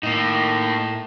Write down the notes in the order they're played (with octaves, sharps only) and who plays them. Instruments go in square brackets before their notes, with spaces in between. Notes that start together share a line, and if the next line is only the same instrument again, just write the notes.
[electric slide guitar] A2 [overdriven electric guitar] A#3 D#4